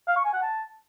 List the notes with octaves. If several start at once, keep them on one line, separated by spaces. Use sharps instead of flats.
F5
C#6
G#5
F#5
A5